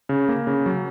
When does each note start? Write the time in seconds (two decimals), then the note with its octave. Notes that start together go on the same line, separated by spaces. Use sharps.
0.09 C#3
0.29 A#3
0.47 C#3
0.66 F#3